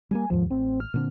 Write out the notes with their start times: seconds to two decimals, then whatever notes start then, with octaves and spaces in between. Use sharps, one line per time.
0.11 G3 G#3 A#3 G#5
0.30 A1 D#2 G#2 F3
0.50 A1 C4
0.80 F6
0.94 A#2 D3 C4